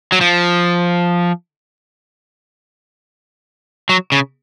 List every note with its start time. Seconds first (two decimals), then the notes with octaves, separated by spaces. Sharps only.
0.12 F#3
0.21 F3
3.89 F#3
4.12 C#3